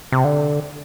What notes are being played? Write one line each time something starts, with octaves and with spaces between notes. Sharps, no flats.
C3
D3